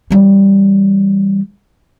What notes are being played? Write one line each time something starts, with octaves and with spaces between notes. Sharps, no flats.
E3 G3